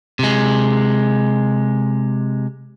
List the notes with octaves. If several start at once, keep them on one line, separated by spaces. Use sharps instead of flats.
C3 G#3